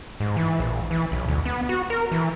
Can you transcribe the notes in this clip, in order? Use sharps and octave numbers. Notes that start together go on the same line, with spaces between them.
G#2
E3
A#1
E3
B1
D2
B3
F#4
A#4
E3